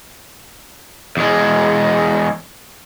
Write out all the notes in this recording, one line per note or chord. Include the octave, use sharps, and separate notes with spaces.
E2 G#3